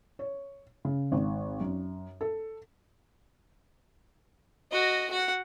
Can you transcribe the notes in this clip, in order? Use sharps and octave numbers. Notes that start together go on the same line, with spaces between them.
C#5
C#3
G#1
F#2
A4
F#4 D#5
F#4 F#5